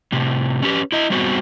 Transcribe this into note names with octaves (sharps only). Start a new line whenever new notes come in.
A2 C3
C#4 G4 B4
E4 D#5
G3 B3 C4 F#4